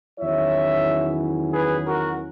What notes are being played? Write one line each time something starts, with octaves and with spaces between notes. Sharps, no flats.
E2 D#3 F#3 C#4 E4 C#5 E5
G#4 B4
F#4 A#4